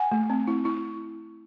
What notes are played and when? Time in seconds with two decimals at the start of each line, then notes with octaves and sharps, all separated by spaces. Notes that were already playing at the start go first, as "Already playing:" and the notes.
Already playing: F#5 G#5
0.12 A3
0.30 C4
0.47 E4
0.65 E4